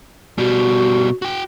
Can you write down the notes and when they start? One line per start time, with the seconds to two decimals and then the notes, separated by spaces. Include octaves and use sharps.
0.38 B2 G3 F#4
1.22 F#4 G5